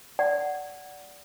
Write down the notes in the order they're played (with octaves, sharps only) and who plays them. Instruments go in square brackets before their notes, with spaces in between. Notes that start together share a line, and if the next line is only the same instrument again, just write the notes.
[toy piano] D5 F#5